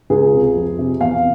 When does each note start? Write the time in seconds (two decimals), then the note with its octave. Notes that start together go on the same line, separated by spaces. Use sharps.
0.10 C#2 G#4
0.33 C3
0.56 F2
0.79 C3
1.00 E2 F5